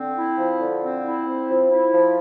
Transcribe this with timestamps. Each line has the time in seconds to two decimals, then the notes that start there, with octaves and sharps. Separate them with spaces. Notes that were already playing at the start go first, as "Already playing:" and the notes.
Already playing: D3 C4
0.16 E4
0.37 F3
0.59 D3
0.82 C4
1.04 E4
1.26 C4
1.48 F3
1.71 E4
1.92 F3